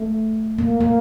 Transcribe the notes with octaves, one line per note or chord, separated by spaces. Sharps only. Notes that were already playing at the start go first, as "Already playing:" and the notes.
Already playing: A3
A#3
A#3